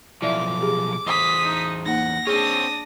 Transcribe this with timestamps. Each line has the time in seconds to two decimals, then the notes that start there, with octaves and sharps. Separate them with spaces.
0.22 B1 F3 E4 D5 E5 D6
0.61 G4 G#4
1.06 E2 C5 D#6 B6
1.43 D#4
1.86 A#3 D#4 F#5 A#6
2.27 C4 D4 G#4 C#5 D#6